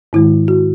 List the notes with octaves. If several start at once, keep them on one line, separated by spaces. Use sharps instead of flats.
G#2 D#3 G#3 E4
F#4